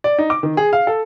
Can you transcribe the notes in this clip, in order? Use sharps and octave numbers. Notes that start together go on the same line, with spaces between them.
D5
D#4
D6
D#3
G#4
F5
A4